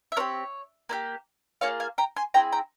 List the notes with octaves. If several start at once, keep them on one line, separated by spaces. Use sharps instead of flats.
E5
C4 G4 A#4 C#5
A#3 E4 G4
A#3 F4 G#4 C#5 F5
F5 G#5
G5 A#5
G#5 C6
C4 E4 G#4 G5 A#5
G5 A#5